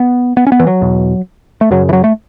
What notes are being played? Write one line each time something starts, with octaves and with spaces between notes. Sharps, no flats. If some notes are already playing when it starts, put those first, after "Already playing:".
Already playing: B3
B3
C#4
B3
E3
F#3
E2 B2
A3
F#2 C#3 F#3
E3
F#3
A3